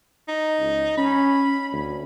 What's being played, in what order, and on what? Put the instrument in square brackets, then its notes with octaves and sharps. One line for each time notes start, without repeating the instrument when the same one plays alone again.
[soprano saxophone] D#4
[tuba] C#2
[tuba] C#4 [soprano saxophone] B5
[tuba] D2